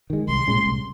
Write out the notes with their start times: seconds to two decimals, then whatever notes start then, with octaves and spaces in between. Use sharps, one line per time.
0.10 D#3 G#3
0.28 C2 C6
0.48 A#2 G#3 C#4
0.66 C2